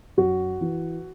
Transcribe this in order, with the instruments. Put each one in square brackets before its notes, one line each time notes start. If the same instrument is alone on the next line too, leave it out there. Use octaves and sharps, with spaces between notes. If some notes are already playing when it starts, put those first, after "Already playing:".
[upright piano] F#2 F#4
E3